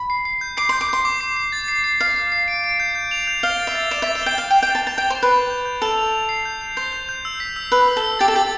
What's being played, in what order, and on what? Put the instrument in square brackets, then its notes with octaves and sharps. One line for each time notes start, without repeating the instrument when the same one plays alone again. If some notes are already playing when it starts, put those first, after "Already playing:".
Already playing: [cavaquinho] B5
[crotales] C7
C7
G6
[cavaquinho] D6 [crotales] C7
[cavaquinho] C6 [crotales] G6
[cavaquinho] D6
[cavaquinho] C6 [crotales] G6
[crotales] D6
C7
C7
A6
C7
C7
[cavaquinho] F5 [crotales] C7
[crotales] C7
C7
D7
D7
G6
G6
F7
G6
[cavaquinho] F5 [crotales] G7
[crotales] A6
[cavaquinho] E5
[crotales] A6
[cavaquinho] D5 [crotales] E7
[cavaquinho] E5
[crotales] A6
[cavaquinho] E5
[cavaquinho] G5 [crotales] G7
[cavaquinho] F5 [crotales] A6
[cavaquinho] G5
[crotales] F7
[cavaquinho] G5
[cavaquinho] A5 [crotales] A6
[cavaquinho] A5 [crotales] F7
[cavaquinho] G5 [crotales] A6
[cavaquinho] C5
[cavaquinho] B4 [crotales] D7
[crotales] G6
G6
G6
[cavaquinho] A4 [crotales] F7
[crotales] F7
F7
C7
G6
G6
[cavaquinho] C5 [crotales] G6
[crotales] G6
G6
E6
B6
E6
[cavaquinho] B4 [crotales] E6
[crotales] E6
[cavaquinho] A4
[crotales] E6
[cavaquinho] G4 [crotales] A6
[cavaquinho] A4
[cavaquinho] G4 [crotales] A6